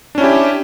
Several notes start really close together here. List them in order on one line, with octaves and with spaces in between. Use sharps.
D4 C#4 E4 G4